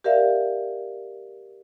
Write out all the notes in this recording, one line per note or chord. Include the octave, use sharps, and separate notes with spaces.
G4 A#4 D5 E5 F5